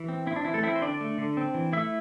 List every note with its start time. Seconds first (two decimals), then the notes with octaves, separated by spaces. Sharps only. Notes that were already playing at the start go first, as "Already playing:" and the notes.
Already playing: E3
0.09 C4
0.26 C4 E4
0.36 D4
0.45 E3 E4
0.54 A3 A4
0.63 C4 E4 E5
0.76 C5
0.82 D3 D4 D5
1.01 A3
1.18 D3
1.37 C4
1.54 E3
1.73 A3 E4 E5